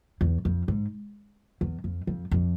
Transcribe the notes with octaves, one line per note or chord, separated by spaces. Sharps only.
E2
F2
G#2
E2
F2
F2
F2